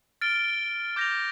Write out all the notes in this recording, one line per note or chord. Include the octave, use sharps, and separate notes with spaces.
F6 A6 D7 G7
D6 G6 A#6 F7